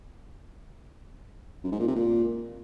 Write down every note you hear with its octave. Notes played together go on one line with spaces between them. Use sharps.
F#2
G#2
A#2
C3
A#2